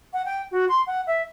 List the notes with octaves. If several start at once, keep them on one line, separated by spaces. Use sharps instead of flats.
F#5
G5
F#4
C6
F#5
E5